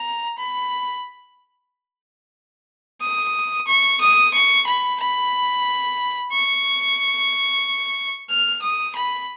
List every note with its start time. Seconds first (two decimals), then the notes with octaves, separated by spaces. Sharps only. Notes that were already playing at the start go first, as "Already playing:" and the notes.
Already playing: A#5
0.38 B5
3.01 D#6
3.67 C#6
4.01 D#6
4.34 C#6
4.67 B5
5.00 B5
6.32 C#6
8.30 F6
8.62 D#6
8.96 B5